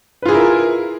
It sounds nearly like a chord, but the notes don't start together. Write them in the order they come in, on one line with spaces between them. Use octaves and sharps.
B4 F4 G#4 E4 A#4